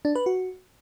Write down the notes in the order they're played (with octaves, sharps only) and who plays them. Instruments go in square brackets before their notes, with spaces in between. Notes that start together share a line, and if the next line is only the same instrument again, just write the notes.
[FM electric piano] D4
B4
F#4